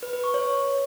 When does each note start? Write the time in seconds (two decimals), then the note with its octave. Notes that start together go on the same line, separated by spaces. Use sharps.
0.03 B4
0.13 B4
0.24 C#6
0.34 C#5